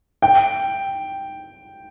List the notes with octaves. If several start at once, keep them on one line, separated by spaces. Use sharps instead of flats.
G5